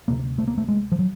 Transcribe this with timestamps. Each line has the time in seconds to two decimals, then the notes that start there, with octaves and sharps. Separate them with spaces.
0.08 D2 C3 A#3
0.38 A3
0.47 A#3
0.58 A3
0.68 G#3
0.92 F3
0.99 F#3